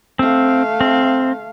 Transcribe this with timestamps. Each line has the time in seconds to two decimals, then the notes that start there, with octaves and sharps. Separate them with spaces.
0.19 A3 C4 F5
0.81 C4